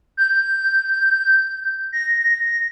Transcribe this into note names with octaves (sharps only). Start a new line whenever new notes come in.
G6
A#6